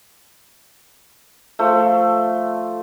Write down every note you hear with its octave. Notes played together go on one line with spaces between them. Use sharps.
F3 A3